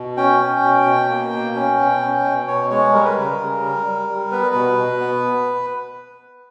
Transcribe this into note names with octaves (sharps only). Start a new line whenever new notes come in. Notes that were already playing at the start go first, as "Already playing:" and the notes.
Already playing: B2
C#4 G5
C#4
B2
B2
A#3
B2
C#4
B2
C#4
B2
B2 C#5
G#3 C#5
G3 A#4
B4
C#3 A#4
C#3
G3
G3
G3
B3 B4
B2
B2
B3